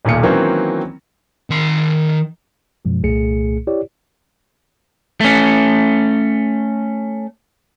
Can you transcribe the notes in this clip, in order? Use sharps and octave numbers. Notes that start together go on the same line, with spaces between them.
D#1 B1 A#2 C#7
D#3 E3 F#3 A#3 C4 C#4
D#3 C6
F#2 B2 F3 G#3
C2 A#2 A3 G#4 C#7
E4 G4 C#5 D5
A3 C#4